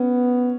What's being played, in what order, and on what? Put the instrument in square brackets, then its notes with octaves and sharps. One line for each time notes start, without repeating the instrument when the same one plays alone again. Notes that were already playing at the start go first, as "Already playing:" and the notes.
Already playing: [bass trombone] B3 [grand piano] C#4